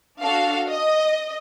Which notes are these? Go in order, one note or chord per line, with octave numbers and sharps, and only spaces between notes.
D4 F#4 A4 F5
D#5